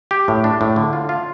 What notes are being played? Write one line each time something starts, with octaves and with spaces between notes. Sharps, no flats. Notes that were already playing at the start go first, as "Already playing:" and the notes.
G4
A2
D4
A2
D3
F4
F4